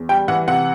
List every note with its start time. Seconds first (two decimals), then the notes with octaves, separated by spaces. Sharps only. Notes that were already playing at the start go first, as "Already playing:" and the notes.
Already playing: E2
0.09 G3 G5
0.28 E3 F#5
0.48 C3 F#5